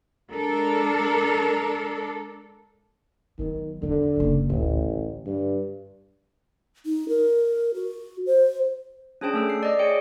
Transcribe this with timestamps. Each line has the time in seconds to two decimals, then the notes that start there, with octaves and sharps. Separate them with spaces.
0.31 G#3 D4 A4 A#4
3.39 D#3 F#3 B3
3.83 E2 D3 G3
4.16 F#1 E2
4.50 A1 D2 A#2
4.90 D3
5.26 G2
6.85 D#4
7.09 A#4
7.74 F#4
8.26 C5
9.21 C#4 D4 G#4 C5 G5 A5
9.34 A3 A4 E6
9.50 C7
9.63 D5 D#5
9.79 G#4 C#5 G5 C#7